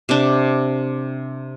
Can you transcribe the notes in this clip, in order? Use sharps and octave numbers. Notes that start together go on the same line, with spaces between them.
C3 D4